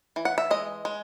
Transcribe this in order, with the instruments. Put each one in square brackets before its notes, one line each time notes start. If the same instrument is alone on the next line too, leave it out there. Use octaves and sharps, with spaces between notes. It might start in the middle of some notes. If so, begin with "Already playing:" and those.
[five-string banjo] E3
F#5
E5
G#3 D#5
G#3